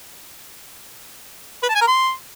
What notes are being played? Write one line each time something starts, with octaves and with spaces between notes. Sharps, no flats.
B4
A5
G#5
A#4
C6